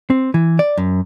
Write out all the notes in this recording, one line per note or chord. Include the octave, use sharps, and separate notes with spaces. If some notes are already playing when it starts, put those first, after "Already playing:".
C4
E3
D5
F#2